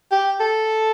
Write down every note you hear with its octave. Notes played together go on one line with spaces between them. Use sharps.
G4
A4